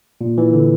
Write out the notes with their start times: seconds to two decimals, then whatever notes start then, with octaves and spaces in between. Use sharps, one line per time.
0.21 A#2
0.38 E3
0.53 D3